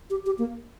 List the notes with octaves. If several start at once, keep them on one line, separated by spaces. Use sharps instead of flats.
G4
G4
A#3